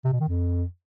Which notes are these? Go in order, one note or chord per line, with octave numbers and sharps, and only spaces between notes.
C3
B2
D#3
F2